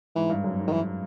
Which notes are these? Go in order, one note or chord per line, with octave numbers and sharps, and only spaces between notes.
G#2 E3
G2
F#2
G#2
D#3
E3